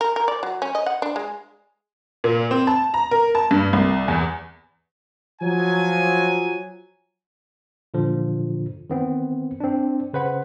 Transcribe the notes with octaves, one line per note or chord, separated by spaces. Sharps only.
A#4
A#4
D5
F#3
C#4
D#5
F#5
D4
G#3
A#2
C4
A5
A#5
A#4
A5
G2
C2
E2
F3 F#3 G#5
A#2 D3 F3
D#3 B3 C4
C4 D4
C#3 B4 C5 F#5 B5